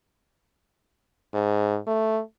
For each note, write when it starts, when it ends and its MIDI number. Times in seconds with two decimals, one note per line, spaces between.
1.34 1.77 44
1.87 2.21 57